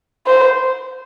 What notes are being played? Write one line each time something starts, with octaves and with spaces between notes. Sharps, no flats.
C5